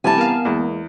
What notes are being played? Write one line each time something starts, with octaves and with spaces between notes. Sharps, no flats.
C3 E3 G3 G#5 A5
B3 A#4 F5
E2 G#3 A#3